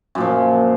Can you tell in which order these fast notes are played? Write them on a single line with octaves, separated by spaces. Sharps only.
F#2 A#2 F3